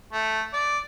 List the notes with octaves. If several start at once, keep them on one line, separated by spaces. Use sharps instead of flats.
A3
D5